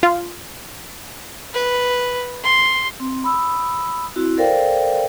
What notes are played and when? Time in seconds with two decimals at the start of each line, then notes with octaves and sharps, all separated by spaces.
0.03 F4
1.54 B4
2.44 C6
3.00 C4
3.24 B5 D#6 E6
4.16 C4 E4 F#4
4.38 A4 A#4 C5 D5 F5 G5